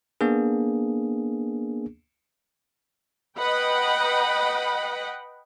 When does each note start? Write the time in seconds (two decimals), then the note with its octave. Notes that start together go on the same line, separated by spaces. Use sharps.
0.21 A#3 B3 D4 G#4
3.37 B4 D#5 F#5 G5 B5